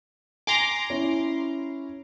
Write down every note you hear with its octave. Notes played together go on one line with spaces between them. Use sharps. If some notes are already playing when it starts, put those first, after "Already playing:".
G#5 A#5 C6 D6
C#4 E4 C#5